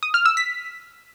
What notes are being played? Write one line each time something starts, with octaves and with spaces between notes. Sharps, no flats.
D#6
F6
E6
B6